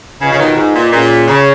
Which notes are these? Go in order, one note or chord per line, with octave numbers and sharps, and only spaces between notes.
C#3 F4 B4 D#5 F#5
C#3
B2 D#3
G#2
A#2
A#2 C#4 G#4 C#5 F#5
C#3